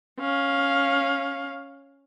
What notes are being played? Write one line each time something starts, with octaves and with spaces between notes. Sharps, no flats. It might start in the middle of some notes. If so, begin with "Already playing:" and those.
C#4 F5